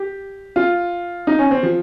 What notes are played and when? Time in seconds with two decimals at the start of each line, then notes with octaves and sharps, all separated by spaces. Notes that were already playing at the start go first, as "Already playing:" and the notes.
Already playing: G4
0.56 F4
1.27 D#4
1.39 C#4
1.51 C4
1.63 F3